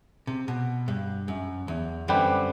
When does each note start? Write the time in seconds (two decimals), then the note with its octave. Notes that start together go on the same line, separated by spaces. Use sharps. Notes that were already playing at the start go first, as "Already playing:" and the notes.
0.27 C3
0.48 B2
0.88 G2
1.28 F#2
1.68 E2
2.08 F#2 D3 G3 C4 G4 B4